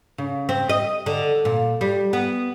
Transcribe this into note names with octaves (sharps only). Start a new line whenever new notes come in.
C#3
C4
D#5
D3
A#2
G3
B3